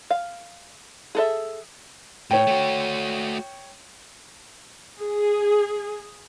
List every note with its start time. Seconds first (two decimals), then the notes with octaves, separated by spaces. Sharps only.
0.10 F5
1.15 G#4 A4 E5
2.31 A2 C#5 G5
2.47 A3 F#4
5.00 G#4